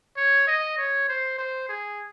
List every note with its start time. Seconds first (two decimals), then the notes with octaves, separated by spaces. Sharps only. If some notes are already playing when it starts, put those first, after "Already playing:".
0.17 C#5
0.47 D#5
0.77 C#5
1.08 C5
1.38 C5
1.69 G#4